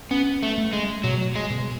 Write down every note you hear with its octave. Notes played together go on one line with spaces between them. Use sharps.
B3 C#4
A3
A3
G#3
B2 F#3
G#3
B2